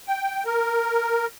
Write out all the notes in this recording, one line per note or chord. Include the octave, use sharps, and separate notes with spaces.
G5
A#4